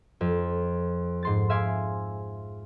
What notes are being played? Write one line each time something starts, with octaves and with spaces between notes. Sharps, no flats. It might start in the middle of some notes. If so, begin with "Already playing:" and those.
F2
G#2 C6 A6
E5 F5 G#5 C6 D6